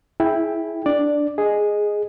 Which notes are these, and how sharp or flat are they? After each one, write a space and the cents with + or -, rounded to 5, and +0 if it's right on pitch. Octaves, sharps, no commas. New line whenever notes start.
E4 -5 G#4 +15 G5 +10
D4 +0 D5 +0
G#4 +0 D#5 -5